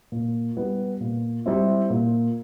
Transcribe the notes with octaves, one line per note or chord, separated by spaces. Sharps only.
A#2
G3 B3
A#2
G3 C4 E4
A#2